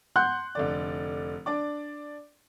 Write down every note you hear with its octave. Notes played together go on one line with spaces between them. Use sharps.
F#5 C6 F#6 G6
F1 D3 D5
D4 D5 D6